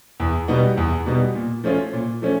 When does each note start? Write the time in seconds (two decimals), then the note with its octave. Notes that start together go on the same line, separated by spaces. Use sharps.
0.20 E2
0.48 B2 G3 B3 D#4
0.77 E2
1.06 B2 G3 B3 D#4
1.35 A#2
1.64 F3 A3 C#4 F4
1.93 A#2
2.22 F3 A3 C#4